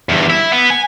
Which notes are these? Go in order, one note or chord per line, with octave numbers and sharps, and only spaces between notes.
E2 G2
E4
B3
G#5